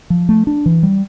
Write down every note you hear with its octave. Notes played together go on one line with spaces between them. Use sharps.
F3
A3
D4
E3
G3